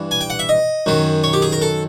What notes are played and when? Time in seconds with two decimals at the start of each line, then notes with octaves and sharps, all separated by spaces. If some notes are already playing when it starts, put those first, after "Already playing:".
Already playing: G2 E3
0.11 G#5
0.21 G5
0.30 F#5
0.39 E5
0.49 D#5
0.86 F#2 D#3 F#3
1.24 C#5
1.33 G4
1.42 G#4
1.52 A#4
1.62 A4